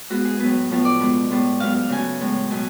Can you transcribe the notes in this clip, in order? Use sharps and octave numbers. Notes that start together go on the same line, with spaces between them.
G#2 G#3 B3 F#4
G#4
A2 F#3 B3 B4
A2 F3 B3
D5
B2 G#3 B3
A2 G#3 B3
G#2 F#3 B3 F5
F5
C#3 F#3 A3 G#5
A2 G#3 B3
B2 F#3 A3 G#5